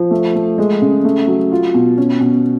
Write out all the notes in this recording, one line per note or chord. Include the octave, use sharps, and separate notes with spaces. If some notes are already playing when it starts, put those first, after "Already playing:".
Already playing: F3
A3
A3
G#3
C#3
A3
F#3
F4
B2
C#4
B2